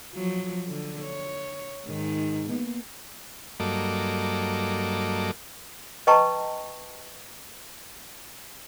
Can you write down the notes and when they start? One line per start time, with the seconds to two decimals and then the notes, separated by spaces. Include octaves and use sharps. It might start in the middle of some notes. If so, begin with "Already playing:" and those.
0.14 F3 F#3
0.68 D3
1.02 C#5
1.87 G#2 D#3
2.49 A#3 B3
3.60 G2 F#3 A#3 A4 D#5 D6
6.07 B4 D#5 G5 A5 A#5 C#6